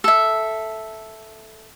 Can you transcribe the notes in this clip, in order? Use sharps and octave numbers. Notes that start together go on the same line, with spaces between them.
A4 E5